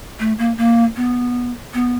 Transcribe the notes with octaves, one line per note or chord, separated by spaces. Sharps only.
A3
A#3
A#3
B3
B3